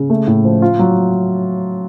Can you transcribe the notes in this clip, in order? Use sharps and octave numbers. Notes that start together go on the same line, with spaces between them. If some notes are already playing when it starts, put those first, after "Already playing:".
Already playing: C#3
A3
A2
F3
F4
F#3